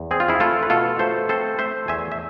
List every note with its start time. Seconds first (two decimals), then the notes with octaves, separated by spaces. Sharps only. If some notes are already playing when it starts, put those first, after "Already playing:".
Already playing: E2
0.11 C4 G#4
0.20 F4
0.28 E4 G#4
0.40 A3 F4 A4
0.63 B4
0.70 B2 F4 A4
0.99 A3 A4 C5
1.29 C4 A4 C5
1.59 A3 C5 E5
1.88 E2 E5 G#5
2.12 E5